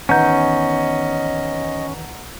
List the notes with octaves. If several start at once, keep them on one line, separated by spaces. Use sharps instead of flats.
E2 D#3 C#4 D#5 F#5 A#5 G6